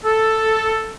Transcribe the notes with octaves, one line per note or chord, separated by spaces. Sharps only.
A4